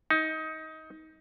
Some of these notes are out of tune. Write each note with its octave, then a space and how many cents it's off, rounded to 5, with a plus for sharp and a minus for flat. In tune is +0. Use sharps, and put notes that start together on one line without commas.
D#4 +20